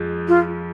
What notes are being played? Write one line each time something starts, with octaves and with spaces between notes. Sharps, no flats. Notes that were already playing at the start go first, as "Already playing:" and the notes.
Already playing: F2 F3 G#3
F4